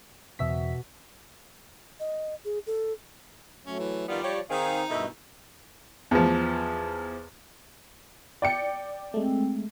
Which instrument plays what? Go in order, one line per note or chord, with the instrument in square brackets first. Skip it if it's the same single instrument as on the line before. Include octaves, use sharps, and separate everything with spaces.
[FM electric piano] E2 E5 B6 [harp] B2
[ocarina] D#5
G#4
A4
[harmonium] F#3 A3 [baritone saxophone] C#4
[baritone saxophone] E3
[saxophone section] D#3 B3 F4 [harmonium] F3 D5 [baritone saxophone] G3
[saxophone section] G4 C#5
[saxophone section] D#3 G#4 [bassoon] C4 [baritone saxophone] D#4 [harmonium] F5
[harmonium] G2 D#5 E5 [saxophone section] B2 D#3 A3 [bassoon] E4
[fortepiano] E2 F3
[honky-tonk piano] D5 G5 C#7
[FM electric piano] G#3 A3 [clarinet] C4